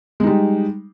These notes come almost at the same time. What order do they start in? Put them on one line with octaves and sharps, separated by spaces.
G#3 D#4 G3